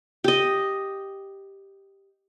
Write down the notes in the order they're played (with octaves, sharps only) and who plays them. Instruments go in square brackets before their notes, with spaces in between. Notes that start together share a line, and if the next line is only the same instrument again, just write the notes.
[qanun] G4 D#5